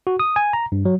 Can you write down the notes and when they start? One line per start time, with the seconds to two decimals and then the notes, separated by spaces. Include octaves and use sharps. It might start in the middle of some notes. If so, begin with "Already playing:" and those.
0.07 F#4
0.20 D#6
0.36 G#5
0.53 A#5
0.72 G2
0.85 F#3